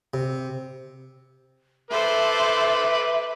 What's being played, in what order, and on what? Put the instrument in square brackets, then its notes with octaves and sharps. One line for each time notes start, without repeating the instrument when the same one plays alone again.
[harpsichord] C3
[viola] A4 C5 [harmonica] B4 D6 [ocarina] E5